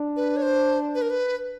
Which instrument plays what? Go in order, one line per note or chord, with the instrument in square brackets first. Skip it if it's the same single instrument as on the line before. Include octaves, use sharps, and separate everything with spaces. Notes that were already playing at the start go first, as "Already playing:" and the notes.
Already playing: [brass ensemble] D4
[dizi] B4
C#5
C5
B4
A#4
B4